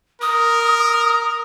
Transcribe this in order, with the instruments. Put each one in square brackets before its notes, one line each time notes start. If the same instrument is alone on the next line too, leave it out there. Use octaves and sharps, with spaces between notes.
[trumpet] A#4 [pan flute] D#6